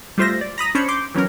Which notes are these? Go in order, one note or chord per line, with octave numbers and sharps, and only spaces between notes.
G3 A3 F4 C5 E5 A#6
D5
A#5 B5 D#6 A#6
C#4 D4 C5 C#5 B5 C#7
C6 D6 G6
E3 F#3 B3 C#4 A#4